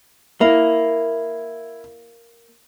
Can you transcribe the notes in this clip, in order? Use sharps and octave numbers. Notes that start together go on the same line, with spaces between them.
A#3 E4